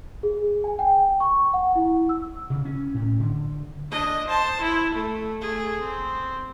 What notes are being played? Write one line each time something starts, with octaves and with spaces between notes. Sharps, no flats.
G#4
G#5
G5
C#6
F#5
E4
E6
C#3
C#4
A2
D3
D4 D#5
C5 A5
E4
A3
A3 G#4
C4